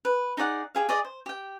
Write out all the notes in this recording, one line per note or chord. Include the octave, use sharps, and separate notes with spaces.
B4
D#4 G#4 D5 F#5
G4 G#4 F5
G#4 D5 D#5
C5
G4 G5